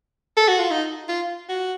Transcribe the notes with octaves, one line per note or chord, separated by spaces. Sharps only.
A4
F#4
F4
D#4
F4
F#4